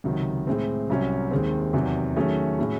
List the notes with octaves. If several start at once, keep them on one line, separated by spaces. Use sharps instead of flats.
C#2 C3 D#3 F#3
A2 G#3 C4
C2 C3 F#3 C#4
D#2 D#3 G#3 C4
E2 C3 D#3 F#3
D#3 F#3 A3 C#4 G#4
A2 G#3 C#4 F#4